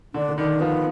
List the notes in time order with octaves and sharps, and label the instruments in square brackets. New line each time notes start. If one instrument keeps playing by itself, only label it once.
[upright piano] D3 [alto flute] D4
[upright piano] D3
[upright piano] D#3 [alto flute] D4
[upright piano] F3 [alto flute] B3